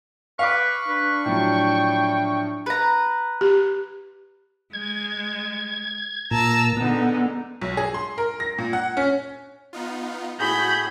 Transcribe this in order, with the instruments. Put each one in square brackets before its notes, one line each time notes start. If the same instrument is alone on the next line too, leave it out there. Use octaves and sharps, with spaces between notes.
[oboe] B4 [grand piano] F5 D6 [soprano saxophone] C#6
[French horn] D4 [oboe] B4
[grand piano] A2 F3 F#3 [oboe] G5
[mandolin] B4 A#5
[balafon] G4
[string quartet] G#3 [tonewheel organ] G#6
[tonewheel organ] A#2 [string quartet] A5 A#5 E6
[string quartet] D3 G#3 D#4 [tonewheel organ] B3
[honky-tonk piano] B1
G#4
C6
A#4
A#6
A#2
F#5
C#4
[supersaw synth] B3 D#4 F4
[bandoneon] A2 G#4 [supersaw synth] F#4 A#6 [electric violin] B5 G6